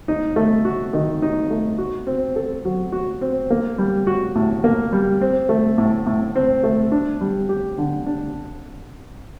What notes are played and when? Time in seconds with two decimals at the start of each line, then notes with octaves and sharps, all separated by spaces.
0.08 D#4
0.36 A3
0.65 F#4
0.93 D#3
1.22 D#4
1.51 A3
1.78 F#4
2.07 C4
2.36 A4
2.65 F#3
2.92 F#4
3.21 C4
3.50 A#3
3.78 G3
4.07 F#4
4.35 A2
4.64 A#3
4.93 G3
5.21 C4
5.49 A3
5.78 A2
6.06 A2
6.36 C4
6.63 A3
6.92 D4
7.21 G3
7.49 G4
7.78 D3
8.06 D4